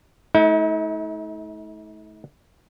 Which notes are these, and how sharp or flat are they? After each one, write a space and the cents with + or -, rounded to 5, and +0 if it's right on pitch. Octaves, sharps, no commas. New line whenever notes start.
A3 -30 D#4 +45